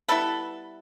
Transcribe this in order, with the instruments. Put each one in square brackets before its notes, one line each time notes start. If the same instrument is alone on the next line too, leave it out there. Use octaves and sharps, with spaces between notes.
[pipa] G3 B3 E4 A4 B4